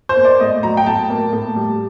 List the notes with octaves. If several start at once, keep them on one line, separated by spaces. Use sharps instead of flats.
C5
A#3
D5
A2 D#5
F#3 A#5
G5
A2 A5
A#3
A2
G3